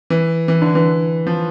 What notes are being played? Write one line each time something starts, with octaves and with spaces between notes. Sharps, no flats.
E3
E3
D3
E3
F3